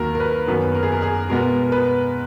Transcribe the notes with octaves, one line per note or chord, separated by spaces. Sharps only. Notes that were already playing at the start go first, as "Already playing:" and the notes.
Already playing: D#2 D#3 F#3 A#3 A#4
A#4
B4
F#2 D#3 F#3 B3 B4
A#4
G#4
A#4
G#4
B2 G#3 B3 A#4
A#4
B4